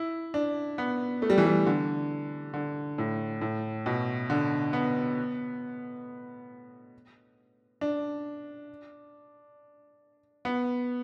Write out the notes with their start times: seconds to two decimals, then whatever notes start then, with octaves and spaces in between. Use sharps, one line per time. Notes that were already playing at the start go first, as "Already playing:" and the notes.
Already playing: E4
0.34 D4
0.78 B3
1.22 A3
1.30 G3
1.38 E3
1.45 G3
1.67 D3
2.54 D3
2.98 A2
3.41 A2
3.86 B2
4.30 D3
4.73 B3
7.81 D4
10.45 B3